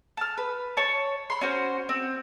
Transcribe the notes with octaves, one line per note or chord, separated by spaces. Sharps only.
A5 F6
B4
C#5 A5
B5 C6
C#4 F#4 C5
C4